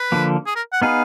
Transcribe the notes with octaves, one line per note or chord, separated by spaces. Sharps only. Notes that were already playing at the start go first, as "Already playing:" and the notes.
Already playing: B4
D3 F3 A#3
G#4
A#4
F#5
B3 D#4 G#4 B4 F5